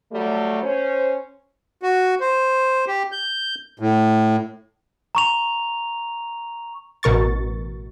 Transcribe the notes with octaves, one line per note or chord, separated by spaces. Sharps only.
F#3 G3 A3
C#4 C5
F#4
C5
G4
G6
A2
A#5 C#6 F7
A1 B2 A#4 C#6 A6